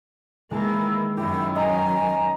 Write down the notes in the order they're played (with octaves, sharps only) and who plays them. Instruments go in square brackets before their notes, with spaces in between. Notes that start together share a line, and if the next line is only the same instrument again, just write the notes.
[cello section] D#3 E3 A#3 [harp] G#3 A5 [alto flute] E4
[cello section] F#2 D#3 F#3 [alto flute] E4 [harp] G4
[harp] D#5 [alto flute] G#5 [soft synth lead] A#5